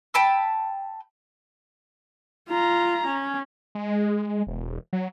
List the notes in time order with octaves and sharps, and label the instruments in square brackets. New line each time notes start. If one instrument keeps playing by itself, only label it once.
[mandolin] G5 A5 B5 E6
[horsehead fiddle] F4 A#5
C#4
[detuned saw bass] G#3
E1
F#3